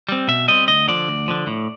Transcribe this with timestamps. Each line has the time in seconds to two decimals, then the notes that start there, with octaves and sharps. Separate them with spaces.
0.09 G3 C4
0.28 B2 E5
0.48 G3 C4 D#5
0.68 D2 D#5
0.88 D3 F3 D5
1.08 D2
1.28 D3 F3
1.47 A2